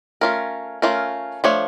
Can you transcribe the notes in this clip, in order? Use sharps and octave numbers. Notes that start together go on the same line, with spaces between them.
A3 C#4 F4 A#4
A3 C#4 F4 A#4
F3 A3 D4 C#5